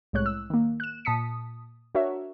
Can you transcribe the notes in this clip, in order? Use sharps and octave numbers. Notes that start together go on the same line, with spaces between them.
C2 A2 G#3 C#5 F#6
E6
D#3 A#3
F#6 E7
A#2 A5 D#6 B6 C#7
D4 F#4 A#4 C#5 E5